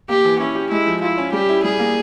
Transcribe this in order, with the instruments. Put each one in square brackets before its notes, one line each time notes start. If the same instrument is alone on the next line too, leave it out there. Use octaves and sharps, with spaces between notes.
[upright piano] A#3 [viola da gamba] G4
[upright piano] E3
[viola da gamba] C#4 [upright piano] E4
[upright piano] G4
[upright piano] G#3 [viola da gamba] E4
[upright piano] F3
[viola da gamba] E4 [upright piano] F4
[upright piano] C#4
[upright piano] G3 [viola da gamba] G4
[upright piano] E4
[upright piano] G3 [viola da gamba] G#4
[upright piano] A#3